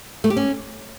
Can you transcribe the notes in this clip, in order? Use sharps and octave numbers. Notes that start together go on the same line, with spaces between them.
A3
G4
C#4